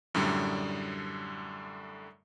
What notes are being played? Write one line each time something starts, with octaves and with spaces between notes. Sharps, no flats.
F#2 A2 D3 G3